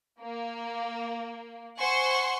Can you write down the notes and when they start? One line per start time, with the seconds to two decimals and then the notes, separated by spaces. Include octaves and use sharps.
0.21 A#3
1.79 C5 F#5 G#5 C6 C#6